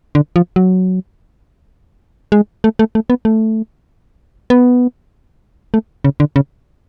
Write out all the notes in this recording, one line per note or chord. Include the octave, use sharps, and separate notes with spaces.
D3
F3
F#3
G#3
A3
A3
A3
B3
A3
B3
A3
C#3
D3
C#3